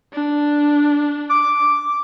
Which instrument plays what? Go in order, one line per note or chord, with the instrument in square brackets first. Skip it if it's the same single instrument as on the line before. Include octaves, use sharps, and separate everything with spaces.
[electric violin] D4
[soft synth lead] D6